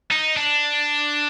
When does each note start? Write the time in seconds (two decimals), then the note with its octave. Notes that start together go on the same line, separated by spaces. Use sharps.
0.11 D#4
0.36 D4